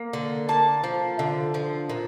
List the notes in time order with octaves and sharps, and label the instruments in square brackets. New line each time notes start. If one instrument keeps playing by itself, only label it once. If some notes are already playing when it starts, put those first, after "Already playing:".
Already playing: [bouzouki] A#3
D3
A#3 A5
F3
D3
F3
A#2